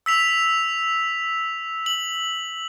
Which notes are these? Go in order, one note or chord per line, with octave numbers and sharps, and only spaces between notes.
E6 B6 F7
F#7